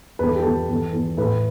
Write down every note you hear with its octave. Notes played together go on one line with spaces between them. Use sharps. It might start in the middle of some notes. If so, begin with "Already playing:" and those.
E2 B4
A4
G4
E2 A4
E2
E2
A2 B4